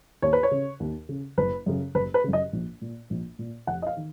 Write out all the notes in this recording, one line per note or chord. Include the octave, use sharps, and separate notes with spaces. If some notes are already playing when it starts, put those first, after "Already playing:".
D#2 C#5
B4
C#5
C#3
D#2
C#3
F#1 B4
F#2 C#3
F#1 B4
B4
F#2 C#3
D#5
A#1
A#2
A#1
A#2
F1 F#5
D#5
F5
D#3